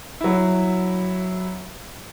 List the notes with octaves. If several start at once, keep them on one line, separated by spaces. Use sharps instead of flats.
F#3 E4